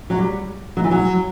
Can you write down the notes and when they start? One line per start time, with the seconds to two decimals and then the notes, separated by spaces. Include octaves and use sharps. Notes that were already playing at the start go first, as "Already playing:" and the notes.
0.10 F#3
0.19 G3
0.77 F#3
0.84 E3
0.91 F#3